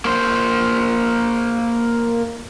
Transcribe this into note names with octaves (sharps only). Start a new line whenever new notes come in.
A#3 C5